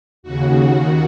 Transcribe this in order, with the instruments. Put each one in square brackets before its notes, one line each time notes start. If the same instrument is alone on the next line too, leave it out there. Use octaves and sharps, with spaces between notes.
[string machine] D#2 C#3 F#4
D#3